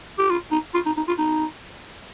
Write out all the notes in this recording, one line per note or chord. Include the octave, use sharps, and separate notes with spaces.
G4
F4
D#4
F4
D#4
D#4
F4
D#4